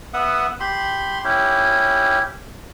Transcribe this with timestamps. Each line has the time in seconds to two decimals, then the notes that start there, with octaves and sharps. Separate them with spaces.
0.14 B3 E5 F#5 D#6
0.60 G4 B5 C6
1.24 C#4 E4 G4